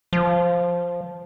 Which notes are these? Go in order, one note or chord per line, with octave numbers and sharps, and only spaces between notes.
F3